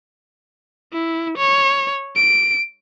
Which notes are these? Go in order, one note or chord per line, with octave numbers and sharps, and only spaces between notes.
E4
C#5
D7